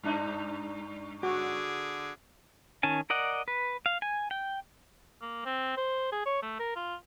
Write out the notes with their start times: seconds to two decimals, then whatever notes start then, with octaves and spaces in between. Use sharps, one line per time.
0.03 G2 D4 D#4
1.23 D3 F#4 G#4 D6
2.83 D#3 C#4 G#5 A5
3.10 A#4 D5 D#5 F#5
3.48 B4
3.86 F5
4.02 G#5
4.31 G5
5.21 A#3
5.46 C4
5.77 C5
6.12 G#4
6.26 C#5
6.42 A3
6.60 A#4
6.76 F4